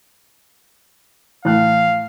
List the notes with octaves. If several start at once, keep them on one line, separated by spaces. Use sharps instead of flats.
A2 E3 F5 F#6